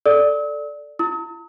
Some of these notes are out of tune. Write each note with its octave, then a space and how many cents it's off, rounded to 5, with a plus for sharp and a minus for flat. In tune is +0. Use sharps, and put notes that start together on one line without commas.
A4 +0 D5 +0 E6 -45
E4 +40 D#6 +45